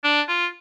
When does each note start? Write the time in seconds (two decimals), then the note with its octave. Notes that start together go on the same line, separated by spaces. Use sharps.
0.04 D4
0.29 F4